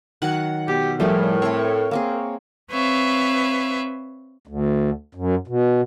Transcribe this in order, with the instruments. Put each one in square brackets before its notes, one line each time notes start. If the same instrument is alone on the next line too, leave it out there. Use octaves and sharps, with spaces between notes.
[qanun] D#3 F#3 C#5 [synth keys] F#5
[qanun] B2 [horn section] G4
[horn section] A2 [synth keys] F3 G3 [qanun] A3 G#4 C#5 [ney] A#4
[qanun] A3 C4 [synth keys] C#5
[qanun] A#3 C4 G#4
[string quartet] C4 B4 C#5 E5 F5
[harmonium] D2
F#2
B2